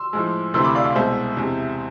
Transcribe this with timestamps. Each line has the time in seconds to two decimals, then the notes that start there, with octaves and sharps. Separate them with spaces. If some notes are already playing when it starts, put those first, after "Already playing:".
Already playing: C6 E6
0.13 A2 F3 G#3
0.54 D2 C3 E3 A3 C6 E6
0.64 B5 D6
0.75 D5 F5
0.85 D5 F5
0.95 C2 B2 G#3 C5 E5
1.37 E2 C3 G#3